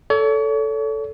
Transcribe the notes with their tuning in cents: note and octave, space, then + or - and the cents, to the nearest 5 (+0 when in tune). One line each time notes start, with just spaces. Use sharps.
A4 +0 C#5 +40